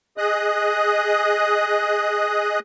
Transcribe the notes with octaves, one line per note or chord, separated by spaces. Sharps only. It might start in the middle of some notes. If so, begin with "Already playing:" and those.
G#4 D#5 D#6 F#6